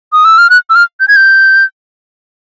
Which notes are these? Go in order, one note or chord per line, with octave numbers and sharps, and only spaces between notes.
D#6
E6
F6
F#6
E6
F6
G6
G#6
G6